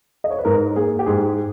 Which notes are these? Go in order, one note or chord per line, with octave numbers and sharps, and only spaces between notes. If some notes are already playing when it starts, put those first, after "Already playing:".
D#5
C#5
B4
G#2 A#4
A#3 G#4
G4
G#2 G#4